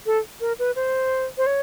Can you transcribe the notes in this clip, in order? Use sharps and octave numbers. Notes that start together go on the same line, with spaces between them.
A4
A#4
B4
C5
C5
C#5